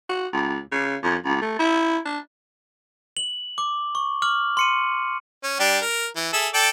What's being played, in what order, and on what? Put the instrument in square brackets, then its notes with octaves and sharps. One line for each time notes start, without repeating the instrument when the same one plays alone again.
[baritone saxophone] F#4
C#2
C#3
F2
C#2
A3
E4
D4
[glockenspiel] F#7
D6
C#6
D6 F6 F#7
C6 C#7 D#7
[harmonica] C#4
G3 D4 G4
A#4
E3
G#4 A4 E5
A4 D5 G5